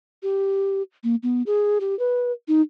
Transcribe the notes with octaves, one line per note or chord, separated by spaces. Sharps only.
G4
A#3
B3
G#4
G4
B4
D#4